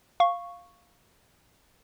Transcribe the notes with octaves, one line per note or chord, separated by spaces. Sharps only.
F5 C#6